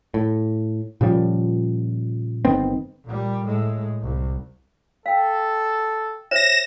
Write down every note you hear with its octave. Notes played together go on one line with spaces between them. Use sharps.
A2
A#2 C#3 F3 G3
G1 D#3 B3 C4
A#2 G3
A2 G#3
C2
A4 F5 G5
C5 C#5 E5 A#6 E7